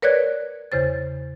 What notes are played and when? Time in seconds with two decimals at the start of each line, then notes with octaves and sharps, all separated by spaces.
0.02 A#4 B4 C#5 D5 F#6 G#6
0.72 E2 C#3 C5 A6